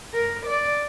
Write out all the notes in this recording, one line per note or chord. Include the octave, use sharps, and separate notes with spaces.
A#4
D5